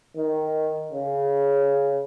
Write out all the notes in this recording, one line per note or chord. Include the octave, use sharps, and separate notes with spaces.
D#3
C#3